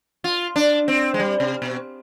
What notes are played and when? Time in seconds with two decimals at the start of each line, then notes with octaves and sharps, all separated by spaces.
0.24 F4
0.56 D4
0.88 C4
1.14 G#3
1.20 G3
1.40 C3
1.62 B2